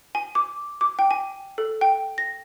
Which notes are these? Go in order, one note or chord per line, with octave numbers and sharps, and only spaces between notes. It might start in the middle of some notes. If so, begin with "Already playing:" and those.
G#5
D6
D6
G5
G#5
A4
G5
A#6